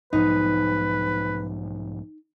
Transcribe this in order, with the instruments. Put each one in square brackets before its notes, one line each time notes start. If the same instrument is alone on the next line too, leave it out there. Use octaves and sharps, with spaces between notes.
[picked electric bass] B1 G#2 F3 [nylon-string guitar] D#4 [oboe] B4